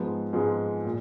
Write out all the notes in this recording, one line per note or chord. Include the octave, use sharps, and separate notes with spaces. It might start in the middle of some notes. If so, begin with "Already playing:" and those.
Already playing: G#2 F3 G#3 B3
G#2 F3 G#3 B3
A#2